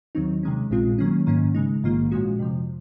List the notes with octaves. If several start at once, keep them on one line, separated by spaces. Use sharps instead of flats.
D#2 D#3 F#3 C4 D#4
C3 D#3 G#3 C#4
A#1 A#2 G#3 C4 F4
D#3 F#3 A#3 C#4
G#2 D#3 A#3 C#4
C#3 G#3 D#4
A#1 G#2 D#3 A#3 F4
A#2 F3 G#3 C#4 F#4
F2 C3 F3